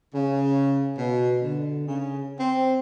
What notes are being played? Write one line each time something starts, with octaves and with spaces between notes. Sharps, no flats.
C#3
B2
D3
C#3
C4